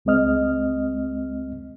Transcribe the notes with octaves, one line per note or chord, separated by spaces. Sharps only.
C#2 G#3 C4 D#5 F6